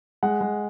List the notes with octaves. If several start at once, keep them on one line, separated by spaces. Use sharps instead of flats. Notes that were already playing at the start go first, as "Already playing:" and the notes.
G#3 F#5
G#3